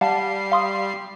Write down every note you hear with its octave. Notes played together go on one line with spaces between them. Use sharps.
G3 F5 F#5 A5 C7
F5 C6 D#6